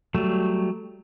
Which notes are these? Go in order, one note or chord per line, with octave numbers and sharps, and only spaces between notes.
F#3 G3 A3